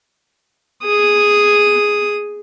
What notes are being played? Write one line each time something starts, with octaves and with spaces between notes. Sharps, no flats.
G#4 D#6